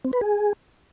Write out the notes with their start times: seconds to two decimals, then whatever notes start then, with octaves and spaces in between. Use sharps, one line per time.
0.05 C4
0.13 B4
0.21 G#4